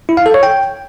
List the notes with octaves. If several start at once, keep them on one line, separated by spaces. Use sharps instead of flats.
E4
F5
A4
C#5
G5